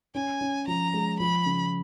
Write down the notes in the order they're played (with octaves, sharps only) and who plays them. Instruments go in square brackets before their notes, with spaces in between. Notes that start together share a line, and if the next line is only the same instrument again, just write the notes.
[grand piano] C#4 [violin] G#5
[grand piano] C#4
[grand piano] F3 [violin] A#5
[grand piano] G#3
[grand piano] F3 [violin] B5
[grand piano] C#3